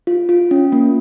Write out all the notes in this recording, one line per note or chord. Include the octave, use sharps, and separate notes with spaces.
F4
F4
C#4
A#3